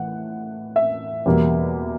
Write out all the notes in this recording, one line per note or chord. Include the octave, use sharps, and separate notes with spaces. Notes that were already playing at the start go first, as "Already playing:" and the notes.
Already playing: A2 E3 F#5
E5
E2 B2 G3 A#3